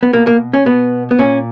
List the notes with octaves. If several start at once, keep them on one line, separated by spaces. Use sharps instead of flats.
B3
B2 A#3
A#3
C#4
B2 B3
B3
A#2 C#4